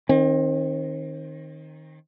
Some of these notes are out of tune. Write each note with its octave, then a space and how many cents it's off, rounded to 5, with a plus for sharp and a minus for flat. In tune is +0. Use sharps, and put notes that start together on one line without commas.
D#3 +0 C4 +35